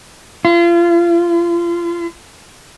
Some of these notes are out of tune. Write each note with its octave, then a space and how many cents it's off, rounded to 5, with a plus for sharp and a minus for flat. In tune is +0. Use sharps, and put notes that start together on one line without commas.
F4 -30